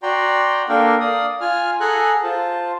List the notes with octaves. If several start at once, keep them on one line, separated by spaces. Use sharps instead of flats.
F#4 D5 G5 A#5 C6
A#3 D4 A4 A#4 F5 G5
D5 F5 D#6
F4 G#5 F6
G#4 A4 F#5 G#5 A#5 F#6
F4 C5 A5